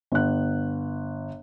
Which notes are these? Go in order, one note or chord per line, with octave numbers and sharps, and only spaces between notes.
G1 F#6